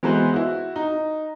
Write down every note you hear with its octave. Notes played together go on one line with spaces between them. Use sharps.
E3 G#3 B3 F#4 B4 C5
E4 F#4
D#4